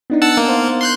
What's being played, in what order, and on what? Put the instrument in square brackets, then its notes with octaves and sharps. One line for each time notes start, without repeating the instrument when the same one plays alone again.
[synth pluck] B3 D4 D#4
[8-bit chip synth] F#5 A5 E6
A#3
[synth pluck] C5 F5
[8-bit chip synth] C6 F#6 G6